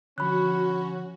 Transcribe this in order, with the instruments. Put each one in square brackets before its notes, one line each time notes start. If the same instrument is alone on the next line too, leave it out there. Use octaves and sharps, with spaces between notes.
[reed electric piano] D3 F3 [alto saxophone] C#4 [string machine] F#4 [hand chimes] B5 F#6